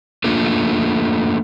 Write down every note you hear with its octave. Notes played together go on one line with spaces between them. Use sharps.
A3 A#3 D4 F4